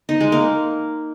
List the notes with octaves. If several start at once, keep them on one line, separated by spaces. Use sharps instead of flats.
D#4
G#3
A#3